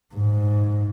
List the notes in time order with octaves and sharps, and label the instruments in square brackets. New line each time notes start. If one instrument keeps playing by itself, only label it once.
[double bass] G#2